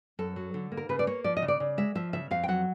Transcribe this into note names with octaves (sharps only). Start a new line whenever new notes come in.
F#2 A4
F#3
D3
A#3
A#4
C#3 B4
D5
A#3 C#5
F3 D5
D#5
C#3
D5
C#3
G#3 E5
F3 E5
C#3 E5
F2 F5
G5
F#3 F#5